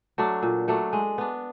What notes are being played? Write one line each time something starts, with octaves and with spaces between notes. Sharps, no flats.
F#3 A3 D4
A#2
F#3 A3 D4
G#3
B3 D4